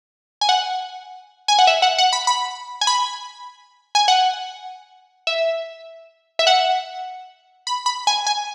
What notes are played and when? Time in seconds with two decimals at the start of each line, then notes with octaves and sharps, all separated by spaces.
0.41 G#5
0.49 F#5
1.48 G#5
1.59 F#5
1.67 E5
1.82 F#5
1.98 F#5
2.13 B5
2.27 B5
2.81 G#5
2.87 B5
3.95 G#5
4.08 F#5
5.27 E5
6.39 E5
6.47 F#5
7.67 B5
7.86 B5
8.07 G#5
8.27 G#5